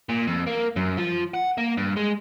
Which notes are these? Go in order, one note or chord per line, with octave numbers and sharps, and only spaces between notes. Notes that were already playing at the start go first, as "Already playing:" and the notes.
A#2
F2
A#3
F#2
F3
F#5
A#3
G2
G#3